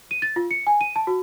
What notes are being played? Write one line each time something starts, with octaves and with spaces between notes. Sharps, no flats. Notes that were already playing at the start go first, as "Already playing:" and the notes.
D#7
A6
F4
C#7
G#5
D#7
A5
F#4